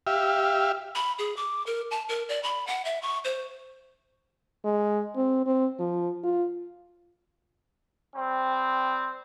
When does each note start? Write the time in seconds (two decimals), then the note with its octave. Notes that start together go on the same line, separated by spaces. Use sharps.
0.07 G4 E5 F5
0.95 B5
1.19 G#4
1.37 D6
1.66 A#4
1.91 A5
2.09 A#4
2.29 D5
2.43 B5
2.67 F#5
2.85 E5
3.02 C#6
3.25 C5
4.65 G#3
5.16 C4
5.46 C4
5.79 F3
6.23 F4
8.15 G3 C4